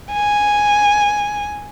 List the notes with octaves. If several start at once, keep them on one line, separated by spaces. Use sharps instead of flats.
G#5